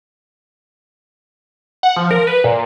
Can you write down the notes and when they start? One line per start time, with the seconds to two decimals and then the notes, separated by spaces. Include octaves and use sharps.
1.83 F#5
1.96 F3
2.11 A#4
2.27 B4
2.44 A#2